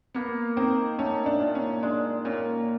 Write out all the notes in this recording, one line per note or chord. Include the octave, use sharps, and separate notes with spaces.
A#3 B3
D#3 C4
A3 C#4
D4
A#2
C#4
G#3 D4
A#2 C#4